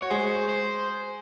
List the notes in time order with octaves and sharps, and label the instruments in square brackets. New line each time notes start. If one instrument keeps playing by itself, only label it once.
[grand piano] F#4 [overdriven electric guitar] C#5
[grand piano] G#3 G#4 [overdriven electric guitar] C5
[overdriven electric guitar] C5